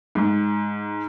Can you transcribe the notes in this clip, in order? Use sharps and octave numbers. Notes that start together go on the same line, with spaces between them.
G#2